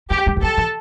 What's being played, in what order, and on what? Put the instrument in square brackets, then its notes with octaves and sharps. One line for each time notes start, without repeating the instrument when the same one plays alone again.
[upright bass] A3 [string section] G4
[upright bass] G3
E3
[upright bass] F#3 [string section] A4
[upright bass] E3